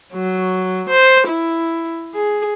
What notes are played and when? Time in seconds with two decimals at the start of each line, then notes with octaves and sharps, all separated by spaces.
0.14 F#3
0.89 C5
1.28 E4
2.15 G#4